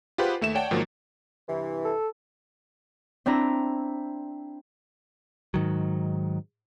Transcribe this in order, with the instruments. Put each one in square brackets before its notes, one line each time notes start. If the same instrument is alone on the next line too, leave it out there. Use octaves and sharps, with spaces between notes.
[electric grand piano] F4 G4 G#4 B4 C5 F#5
D#2 A3 E5 E7
C#5 D5 F#5 G5 A5
G#2 D#3 F3 F#3 A#3
[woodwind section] G2 C3 E3
[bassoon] A4
[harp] C4 D4 E4 A#5
[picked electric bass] G#2 D#3 F#3